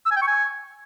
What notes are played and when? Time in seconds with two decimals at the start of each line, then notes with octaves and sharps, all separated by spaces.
0.06 E6
0.11 G#5
0.16 G5
0.22 C#6
0.27 G#5